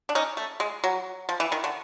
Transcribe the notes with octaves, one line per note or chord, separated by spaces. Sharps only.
D4
C#4 D#4
A3
G#3
F#3
F3
E3
D#3
D3